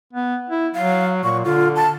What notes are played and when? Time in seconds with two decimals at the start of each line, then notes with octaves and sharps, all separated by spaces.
0.13 B3
0.49 E4
0.75 F#3 F5
1.24 A#2 C#6
1.45 D3 F4
1.76 A5